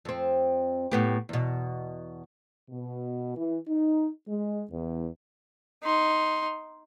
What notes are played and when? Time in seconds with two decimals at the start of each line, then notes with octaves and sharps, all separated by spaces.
0.05 F2 C4
0.92 A2 B3 G4
1.29 E2 B2
2.70 B2
3.36 E3
3.68 D#4
4.28 G#3
4.71 E2
5.84 D#4 C6